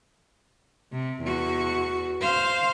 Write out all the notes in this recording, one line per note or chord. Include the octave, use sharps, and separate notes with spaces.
C3
E2 F#4
C5 F5